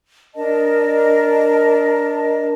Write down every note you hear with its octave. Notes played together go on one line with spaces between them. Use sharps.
D4 A#4 D#5 A5